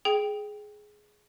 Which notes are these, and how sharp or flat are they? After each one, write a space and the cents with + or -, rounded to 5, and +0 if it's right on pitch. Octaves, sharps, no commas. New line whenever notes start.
G#4 +10 G5 +0